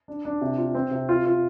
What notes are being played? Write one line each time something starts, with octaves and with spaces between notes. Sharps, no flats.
D4
D4
C3
F4
C4
C3
F4
F4